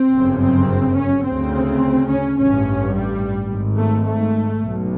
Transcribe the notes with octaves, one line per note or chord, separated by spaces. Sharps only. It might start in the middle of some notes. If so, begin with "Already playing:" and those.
Already playing: C4
G1 F#2 C#3
C4
C#4
D2 C#3 C4
C#4
A1 G2 C#4
G3
G#1 G#2
A3
A3
B1 B2